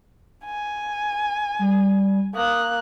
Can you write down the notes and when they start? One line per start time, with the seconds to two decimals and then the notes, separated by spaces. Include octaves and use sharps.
0.45 G#5
1.59 G3
2.34 A#3 D#6 F#6